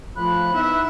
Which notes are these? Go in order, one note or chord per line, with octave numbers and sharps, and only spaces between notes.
A2 F3 B5 F#6
B3 D#4 E4 E5